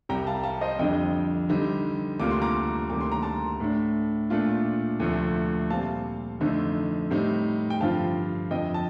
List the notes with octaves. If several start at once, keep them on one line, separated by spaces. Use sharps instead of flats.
C2 C3 G3 G5 A#5
F5 A5
F5 A5
C5 D#5
F2 D3 G3 D4 D#5 G5
D3 G3 C4 D#4
D2 C3 G3 A#3 F4 D6
C6
A#5 D6
D2 C3 D#3 G3 A#3 D6
C6
A#5
A5 C6
A2 A3 D4
A#2 A3 D4 F4
D2 C3 F3 A3 C4
A#2 G3 C4 F5 A5
F2 D3 A3 C4 D#4
A2 G3 C4 D#4
G5
G2 D3 F3 C4 F4 F5 A5
F2 D3 F3 D#5 G5
A5